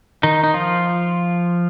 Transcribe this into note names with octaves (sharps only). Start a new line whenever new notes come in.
D#3 D#4
D#4
F3 F4